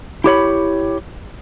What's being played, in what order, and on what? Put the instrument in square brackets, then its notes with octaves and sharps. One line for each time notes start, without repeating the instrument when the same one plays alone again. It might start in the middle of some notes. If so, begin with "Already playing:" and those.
[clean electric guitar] E4 G4 C#5 B5